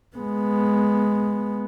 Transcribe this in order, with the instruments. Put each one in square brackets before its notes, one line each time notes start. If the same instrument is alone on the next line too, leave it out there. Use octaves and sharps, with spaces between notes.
[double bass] G#3 B3